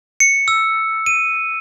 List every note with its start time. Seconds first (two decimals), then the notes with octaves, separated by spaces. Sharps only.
0.20 C#7
0.48 E6
1.06 D#7